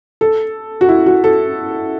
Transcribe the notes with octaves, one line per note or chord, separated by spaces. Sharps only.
A4
F#4
E4
F#4
A4